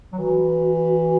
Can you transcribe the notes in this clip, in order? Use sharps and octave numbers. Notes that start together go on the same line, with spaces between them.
F#3
E3 F#4